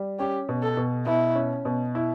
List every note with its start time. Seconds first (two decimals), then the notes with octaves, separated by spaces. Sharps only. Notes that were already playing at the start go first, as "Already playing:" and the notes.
Already playing: G3
0.19 C#4 G4
0.49 B2
0.63 A4
0.77 B2
1.06 B2 E4
1.35 C#4
1.65 B2
1.95 E4